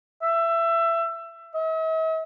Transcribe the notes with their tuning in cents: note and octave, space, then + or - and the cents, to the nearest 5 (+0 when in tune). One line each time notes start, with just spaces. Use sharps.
E5 +20
E5 -45